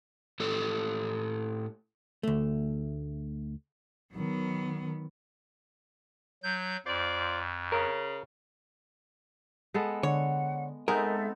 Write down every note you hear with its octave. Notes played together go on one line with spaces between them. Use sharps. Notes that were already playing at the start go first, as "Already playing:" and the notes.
A2 G4 A4
D2 A3
D#3 F#3 B3
F#3 G6
F2 F4 C5 D5
C#3 A#4
G#3 B3 A4
D3 C#5 F#5
G#3 B3 C4 D#4 A4 A#4 D#5 E5